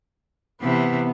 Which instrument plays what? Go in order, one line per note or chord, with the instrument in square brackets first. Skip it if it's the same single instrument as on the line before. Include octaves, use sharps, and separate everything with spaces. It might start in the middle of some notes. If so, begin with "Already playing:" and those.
[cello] C3 E3 [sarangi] B3